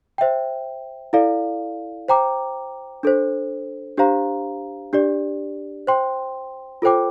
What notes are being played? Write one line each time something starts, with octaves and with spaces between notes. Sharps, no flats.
C5 E5 G5
E4 A4 D5 F5
C5 G5 A#5 D6
D4 A4 C5
D4 G4 C5 F5 A#5
D4 G4 D5
C5 G5 C6
F4 A4 C5 G5 D6